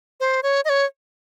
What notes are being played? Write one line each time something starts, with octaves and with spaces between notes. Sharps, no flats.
C5
C#5
D#5
C#5